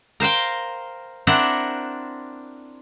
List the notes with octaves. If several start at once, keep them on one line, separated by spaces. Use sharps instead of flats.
A#4 C5 F5 G5
C4 D4 E4 A#4 F#5